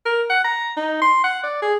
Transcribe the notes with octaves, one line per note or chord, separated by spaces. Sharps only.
A#4
F#5
A#5
D#4
C6
F#5
D5
G#4